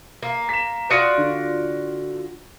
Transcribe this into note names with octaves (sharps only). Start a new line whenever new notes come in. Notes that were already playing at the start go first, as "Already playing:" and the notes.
A#3
B6 E7
F4 F#4 D5 D#6 A#6
D3